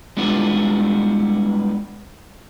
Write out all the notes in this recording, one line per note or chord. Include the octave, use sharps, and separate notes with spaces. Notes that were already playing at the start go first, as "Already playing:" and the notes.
G3 G#3 B3 D4 E4 F4